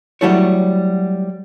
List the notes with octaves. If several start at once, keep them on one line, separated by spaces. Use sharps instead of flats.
F#3 G3 A3 E4 A4 C#5